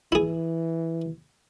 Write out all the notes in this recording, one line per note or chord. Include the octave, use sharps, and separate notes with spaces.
E3 E4 G#4